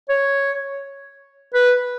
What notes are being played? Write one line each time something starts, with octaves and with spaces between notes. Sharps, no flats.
C#5
B4